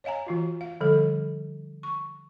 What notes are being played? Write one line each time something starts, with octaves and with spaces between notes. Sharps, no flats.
C#5 D#5 F5 G#5 A#5
E3 F4 F#4
F5
D3 F3 G3 A4
C#6